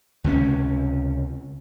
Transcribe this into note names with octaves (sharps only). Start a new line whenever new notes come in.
C#2 C3 C4 C#4